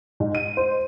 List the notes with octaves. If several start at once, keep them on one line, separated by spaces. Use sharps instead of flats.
G#2
D#7
C5